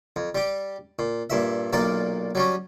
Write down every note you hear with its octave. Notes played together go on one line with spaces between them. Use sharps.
F2
G3 G4
A#2
G2 A#2 E5
B1 A#2 A#4 D5
F#3 G3 C#4